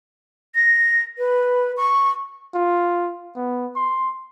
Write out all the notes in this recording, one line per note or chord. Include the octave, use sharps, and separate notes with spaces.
A#6
B4
C#6
F4
B3
C6